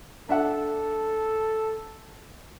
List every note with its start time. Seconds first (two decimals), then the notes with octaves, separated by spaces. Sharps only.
0.29 D4 A4 E5 F#5